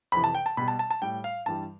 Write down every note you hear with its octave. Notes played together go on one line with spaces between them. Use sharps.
F2 C3 E3 B5
A5
G5
A5
B2 G3 B5
A5
A5
A5
A2 G3 G5
F5
G2 E3 G3 A5